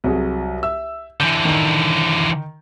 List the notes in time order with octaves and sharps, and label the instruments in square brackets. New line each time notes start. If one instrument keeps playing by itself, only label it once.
[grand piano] C2 F#3 G#4
E5 E6
[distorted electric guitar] D3 E3 [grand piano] G6
[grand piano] D#3 F7